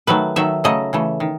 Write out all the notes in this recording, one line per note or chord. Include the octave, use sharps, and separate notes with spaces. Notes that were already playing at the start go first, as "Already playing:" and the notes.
D#3 F#3 A3 B4
D#3 F#3 A3 E5
C#3 F#3 A3 D#5
C#3 E3 A3
D#3